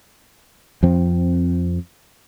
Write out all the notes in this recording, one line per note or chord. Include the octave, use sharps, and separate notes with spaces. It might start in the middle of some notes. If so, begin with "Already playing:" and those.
F2 F3 C4